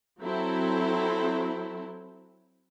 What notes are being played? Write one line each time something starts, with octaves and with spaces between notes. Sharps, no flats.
F#3 C4 E4 A4